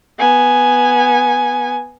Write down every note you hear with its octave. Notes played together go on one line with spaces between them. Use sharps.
B3 G#5